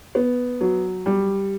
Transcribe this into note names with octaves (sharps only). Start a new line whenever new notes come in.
B3
F#3
G3